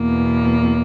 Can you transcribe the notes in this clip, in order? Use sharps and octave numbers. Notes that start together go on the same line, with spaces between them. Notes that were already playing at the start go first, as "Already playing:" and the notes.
Already playing: E2 B2 A#3